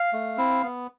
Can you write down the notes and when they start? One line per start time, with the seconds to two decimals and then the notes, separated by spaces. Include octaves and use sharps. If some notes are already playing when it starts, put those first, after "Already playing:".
Already playing: F5
0.13 A3
0.37 C4 E4
0.62 B3